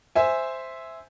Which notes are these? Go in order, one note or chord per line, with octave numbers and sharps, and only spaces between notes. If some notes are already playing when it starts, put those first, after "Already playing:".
C5 E5 G#5